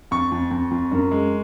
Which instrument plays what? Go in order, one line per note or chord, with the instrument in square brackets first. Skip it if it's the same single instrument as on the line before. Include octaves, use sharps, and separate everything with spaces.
[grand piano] F2 C#6
F2
F2
F2
F#2
G#3